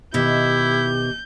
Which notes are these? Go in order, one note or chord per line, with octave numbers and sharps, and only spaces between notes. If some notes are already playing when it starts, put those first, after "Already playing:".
B2 D#3 E4 G4 E5 G6